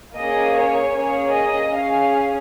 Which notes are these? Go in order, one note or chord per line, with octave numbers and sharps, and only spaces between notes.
A#3 C#4 G#4 D#5
C#5
A#3 C#4 G#4 C#5
D#5
C#4 G#4 F5